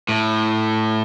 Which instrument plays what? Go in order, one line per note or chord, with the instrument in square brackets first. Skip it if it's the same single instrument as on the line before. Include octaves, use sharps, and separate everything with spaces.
[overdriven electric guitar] A2